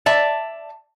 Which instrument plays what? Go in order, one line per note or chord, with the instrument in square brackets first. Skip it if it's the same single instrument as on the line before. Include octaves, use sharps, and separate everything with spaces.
[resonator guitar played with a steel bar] D5 E5 A5